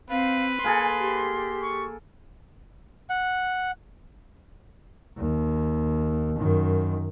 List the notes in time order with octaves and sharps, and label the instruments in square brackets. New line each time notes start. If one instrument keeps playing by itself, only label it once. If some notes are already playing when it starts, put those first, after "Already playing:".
[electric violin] C4 [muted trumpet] B4 [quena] F5
[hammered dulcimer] A#3 G#4 A4 [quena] G#5 [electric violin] C6
[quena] G4
[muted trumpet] C#6
[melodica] F#5
[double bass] D#2
F#2 D#3